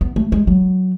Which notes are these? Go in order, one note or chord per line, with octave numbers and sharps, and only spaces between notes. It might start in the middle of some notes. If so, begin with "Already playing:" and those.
B3
A3
G#3
F#3